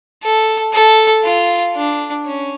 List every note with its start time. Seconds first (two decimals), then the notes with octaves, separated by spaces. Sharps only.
0.23 A4
0.73 A4
1.24 F4
1.76 D4
2.26 C#4